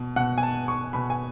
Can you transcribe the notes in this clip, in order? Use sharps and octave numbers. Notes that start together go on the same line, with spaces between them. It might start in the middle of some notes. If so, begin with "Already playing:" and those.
Already playing: B2
B2 F#5
G#5
A5
C#6
B2 B5
G#5